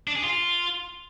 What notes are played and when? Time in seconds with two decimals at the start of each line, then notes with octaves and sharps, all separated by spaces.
0.08 D4
0.16 G#4
0.24 F4